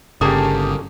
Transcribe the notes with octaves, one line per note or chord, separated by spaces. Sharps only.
G1 C#3 A3 A#3 G4 G#4 D#6